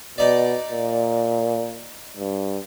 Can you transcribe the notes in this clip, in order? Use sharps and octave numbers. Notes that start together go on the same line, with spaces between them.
B2 D#4 D5
A#2
G2